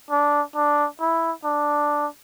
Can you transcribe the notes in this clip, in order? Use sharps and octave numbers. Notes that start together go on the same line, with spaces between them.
D4
D4
E4
D4